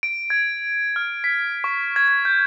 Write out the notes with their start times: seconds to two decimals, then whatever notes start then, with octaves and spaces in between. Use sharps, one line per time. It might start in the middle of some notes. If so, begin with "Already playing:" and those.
0.03 D7
0.30 G#6
0.96 F6
1.24 B6
1.64 C#6
1.96 G#6
2.08 G#6
2.25 G6